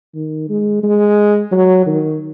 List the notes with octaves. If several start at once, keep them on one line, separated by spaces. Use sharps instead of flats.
D#3
G#3
G#3
F#3
D#3